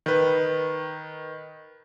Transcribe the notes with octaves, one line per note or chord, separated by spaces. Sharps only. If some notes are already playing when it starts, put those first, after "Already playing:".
D#3 B4